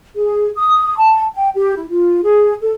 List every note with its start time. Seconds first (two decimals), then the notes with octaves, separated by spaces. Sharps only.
0.16 G#4
0.57 D#6
0.98 A5
1.35 G5
1.55 G4
1.76 E4
1.89 F4
2.23 G#4
2.61 A4